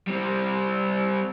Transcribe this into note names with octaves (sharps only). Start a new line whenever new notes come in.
G3 C4